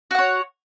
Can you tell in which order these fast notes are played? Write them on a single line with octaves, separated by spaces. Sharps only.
F#4 F#5 C#5